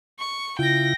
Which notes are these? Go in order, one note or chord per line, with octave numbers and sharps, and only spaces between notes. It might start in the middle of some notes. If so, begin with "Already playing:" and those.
C#6
C#3 E4 F4 G5 A#6